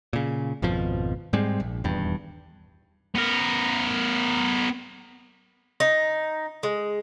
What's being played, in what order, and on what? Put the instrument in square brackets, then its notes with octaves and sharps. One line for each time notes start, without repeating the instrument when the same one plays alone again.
[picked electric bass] A#2 C#3
G#1 F2 B2 F3
G#2 G3 G#3 C4
A#1
D#1 E2 G2 G3
[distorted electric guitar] B3 A#4
[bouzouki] D#4
G#3